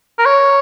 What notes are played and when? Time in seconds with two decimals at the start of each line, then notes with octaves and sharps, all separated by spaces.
0.19 A#4
0.26 C#5